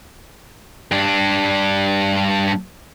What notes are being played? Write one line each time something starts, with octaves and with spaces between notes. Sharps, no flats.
G2 D4